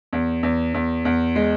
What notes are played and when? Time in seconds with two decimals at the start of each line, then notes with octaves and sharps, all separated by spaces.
0.13 E2
0.43 E2
0.74 E2
1.05 E2
1.36 G#3